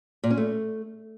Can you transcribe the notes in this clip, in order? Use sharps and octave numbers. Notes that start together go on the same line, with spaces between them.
A#2
C#4
A3